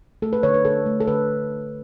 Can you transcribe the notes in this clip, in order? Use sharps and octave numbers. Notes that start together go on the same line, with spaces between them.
A3 A4
B4
D3 C#5
B4
D3 A4
A3
A4
D3 B4